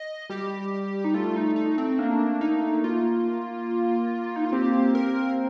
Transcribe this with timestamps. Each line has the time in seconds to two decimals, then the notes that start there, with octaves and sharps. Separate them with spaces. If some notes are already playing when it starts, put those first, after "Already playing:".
Already playing: D#5
0.30 G3 G4
1.04 D#4
1.14 A3 F4
1.36 D#4
1.56 D#4
1.78 C4
1.99 A#3 D4
2.41 D#4
2.84 F4
4.36 D#4
4.44 F4
4.52 C4 G4
4.95 A#4